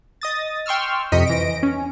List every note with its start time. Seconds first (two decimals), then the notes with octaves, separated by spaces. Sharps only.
0.21 D#5 D#6 A6
0.66 G5 C6 C#6 E6 F6
1.12 F2 C3 D#5 B6 C#7 D#7
1.26 E3 A#6 D7
1.63 C#4